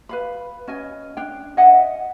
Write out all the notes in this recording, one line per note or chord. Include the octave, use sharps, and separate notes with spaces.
B4 F5 B5
C#4 D#5 G#5
D4 G5
D#5 E5 F#5 G#5